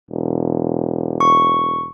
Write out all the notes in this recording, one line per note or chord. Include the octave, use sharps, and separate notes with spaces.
E1
C#6